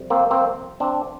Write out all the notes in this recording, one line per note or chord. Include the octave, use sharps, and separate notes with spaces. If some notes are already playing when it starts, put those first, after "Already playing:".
Already playing: F2 C3 G3
A#3 C4
A#3 C4
C4 D4